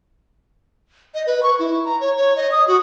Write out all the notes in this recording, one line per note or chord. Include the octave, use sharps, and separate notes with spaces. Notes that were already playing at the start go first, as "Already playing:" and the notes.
D#5
B4
C#6
E4
A#5
C#5
C#5
D#5
D#6
F#4